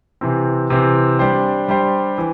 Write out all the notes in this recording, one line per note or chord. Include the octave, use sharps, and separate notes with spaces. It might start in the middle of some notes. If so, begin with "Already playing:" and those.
C3 E3 C4
C3 E3 C4
G3 D4 G4 C5
G3 D4 G4 C5
E3